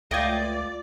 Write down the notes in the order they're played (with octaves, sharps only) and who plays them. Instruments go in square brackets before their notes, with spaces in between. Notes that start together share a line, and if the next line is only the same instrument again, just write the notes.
[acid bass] C#2 [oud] A3 F4 [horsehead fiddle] D5 [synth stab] D#5 G5 G#6